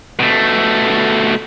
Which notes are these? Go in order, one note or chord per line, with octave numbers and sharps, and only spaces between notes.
B2 A3